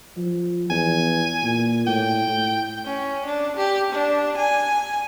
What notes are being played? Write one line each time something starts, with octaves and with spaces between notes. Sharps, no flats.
F3
E2 G#5
A#2
A2 G5
A2
C#4
D4
G4
D4
G#5